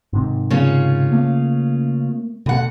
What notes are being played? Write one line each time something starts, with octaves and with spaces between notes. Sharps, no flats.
G#2 C3 D#3
C#3 C#4 F4
A3 A#3
D2 B2 F#5